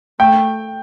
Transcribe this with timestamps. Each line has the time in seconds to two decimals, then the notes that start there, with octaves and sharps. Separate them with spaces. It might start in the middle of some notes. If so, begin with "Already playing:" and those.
0.19 A3 G5